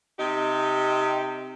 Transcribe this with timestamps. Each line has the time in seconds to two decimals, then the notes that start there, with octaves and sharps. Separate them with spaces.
0.18 C3 D#4 G4